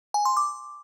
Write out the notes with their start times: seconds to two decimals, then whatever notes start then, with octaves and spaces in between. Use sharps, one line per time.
0.14 G#5
0.25 C6
0.37 D6